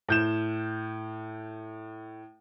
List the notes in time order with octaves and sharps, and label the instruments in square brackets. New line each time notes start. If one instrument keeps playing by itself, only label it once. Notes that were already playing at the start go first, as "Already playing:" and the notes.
[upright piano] A2 G6 E7